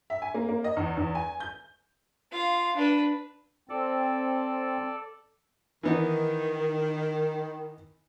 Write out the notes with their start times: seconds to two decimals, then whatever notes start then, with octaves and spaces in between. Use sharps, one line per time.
0.10 E5
0.22 G#5
0.34 A#3
0.49 A#3
0.64 D#5
0.77 E2
0.97 E2
1.15 G#5
1.40 G6
2.31 F4 F5
2.76 D4 B4
3.69 C4 A4 D5
5.83 D#3 E3 B3 D#4